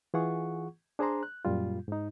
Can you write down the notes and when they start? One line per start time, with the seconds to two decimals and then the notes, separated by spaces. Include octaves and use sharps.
0.14 E3 F4 G#4 F#5 C#6
0.99 D4 G#4 C5 D5 A#5 C6
1.23 F#6
1.45 F#2 A#2 G3 F4
1.88 G#2 D#4